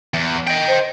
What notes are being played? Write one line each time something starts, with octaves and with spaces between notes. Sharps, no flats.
E2
D#5 G5
C5